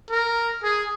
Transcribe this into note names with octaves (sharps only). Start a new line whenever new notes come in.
A#4
G#4